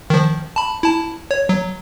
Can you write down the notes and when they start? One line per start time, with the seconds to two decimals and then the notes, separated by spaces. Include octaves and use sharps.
0.10 D#3 F3
0.56 A5 B5
0.83 E4 A5
1.31 C#5
1.49 F#3